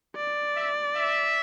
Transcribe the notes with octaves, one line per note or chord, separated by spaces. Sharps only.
D5
E5
E5